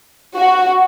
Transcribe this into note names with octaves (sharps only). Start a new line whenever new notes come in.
F#4